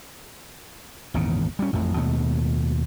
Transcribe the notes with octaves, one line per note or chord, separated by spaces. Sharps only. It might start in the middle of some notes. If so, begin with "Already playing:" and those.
G#1 E2 A#2 C#3
G3 C#4
A1 F2 F3 A3
D#2 B2 G#3 A3